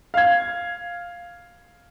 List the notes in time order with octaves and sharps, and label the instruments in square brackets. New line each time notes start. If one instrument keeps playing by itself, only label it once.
[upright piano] F5 G#6